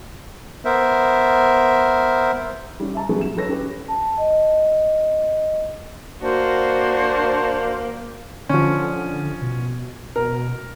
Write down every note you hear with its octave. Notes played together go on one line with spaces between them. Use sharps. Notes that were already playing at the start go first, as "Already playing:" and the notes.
B3 A#4 C5 E5
G3 C#4
E5 A5 A#5
F#3 G3 A#3 B3 C#4 G#4
E7
F#3 A4 B4 C#5 A#6
C#4 G4 B4
A5
D#5
A#3 D4 F#4 C5
D3 F3 C#4
B2
B2 A#4